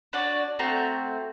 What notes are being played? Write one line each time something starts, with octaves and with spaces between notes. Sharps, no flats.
D4 F#4 C#5 D5
A3 C4 F#4 A#5